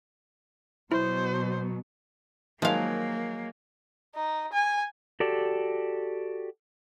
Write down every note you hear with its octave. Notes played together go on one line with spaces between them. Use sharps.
B2 F#3 E4 C5
D#3 F3 F#3 G#3 A#3 F5
D#4
G#5
F#4 G4 A4 D5